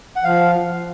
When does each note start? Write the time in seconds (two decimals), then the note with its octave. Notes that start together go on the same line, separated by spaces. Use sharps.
0.16 F#5
0.23 F3 F5